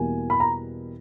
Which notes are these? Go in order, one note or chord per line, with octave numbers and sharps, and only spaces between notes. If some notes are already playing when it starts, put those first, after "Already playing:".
Already playing: E2 B2 G3 A#3 E4 G#5
B5
A#5